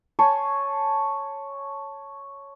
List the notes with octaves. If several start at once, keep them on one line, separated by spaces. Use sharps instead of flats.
C#5 G#5 A5 C6